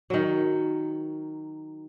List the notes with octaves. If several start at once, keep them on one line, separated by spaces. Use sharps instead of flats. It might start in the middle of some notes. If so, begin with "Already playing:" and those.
D#3 F#3